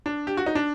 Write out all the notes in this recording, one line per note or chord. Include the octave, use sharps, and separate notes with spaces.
D4
G4
F#4
D#4
D4